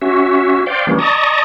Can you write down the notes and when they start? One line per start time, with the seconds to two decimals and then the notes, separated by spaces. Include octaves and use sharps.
0.02 C#4 F#4 E5
0.66 C5 D5 F5 G5
0.87 E3 G3 A#3 C#4
0.98 D5 D#5 A5 A#5 C#6 D#6